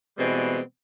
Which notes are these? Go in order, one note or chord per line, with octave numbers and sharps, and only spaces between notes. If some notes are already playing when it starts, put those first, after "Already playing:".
B2 E3 G3 G#3 B3 C4